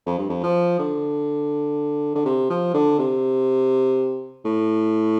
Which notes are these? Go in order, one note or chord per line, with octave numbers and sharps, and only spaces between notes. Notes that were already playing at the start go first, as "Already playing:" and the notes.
F2
G2
F2
F3
D3
D3
C3
F3
D3
C3
A2